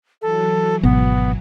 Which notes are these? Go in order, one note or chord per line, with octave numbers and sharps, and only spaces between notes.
E3 F#3 A4
G#1 B2 B3